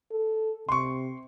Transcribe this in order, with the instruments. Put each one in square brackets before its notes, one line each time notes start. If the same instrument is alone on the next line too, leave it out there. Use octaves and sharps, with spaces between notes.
[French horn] A4
[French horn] C3 [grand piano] C6 C#6